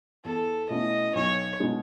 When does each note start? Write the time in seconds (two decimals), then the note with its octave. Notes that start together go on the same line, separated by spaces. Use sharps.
0.25 E2 A4
0.69 B2 A3 C#4 E4 D#5
1.15 B1 C#5
1.60 B2 G#3 D#4 G#4